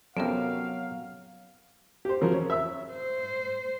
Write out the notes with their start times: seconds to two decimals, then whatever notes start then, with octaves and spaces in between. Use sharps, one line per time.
0.17 F2 C3 F#3 B3 C#4 A#4 F5
2.05 G4 C5
2.21 C#3 F3 F#3 A#4
2.33 C#4
2.50 E5 E6
2.93 C5